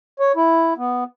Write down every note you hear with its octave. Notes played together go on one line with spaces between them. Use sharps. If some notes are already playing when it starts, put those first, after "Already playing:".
C#5
E4
B3